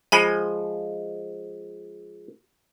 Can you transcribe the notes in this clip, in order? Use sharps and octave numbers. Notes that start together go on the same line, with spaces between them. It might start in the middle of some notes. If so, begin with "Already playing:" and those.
F3 G#3 G#5 B5 G7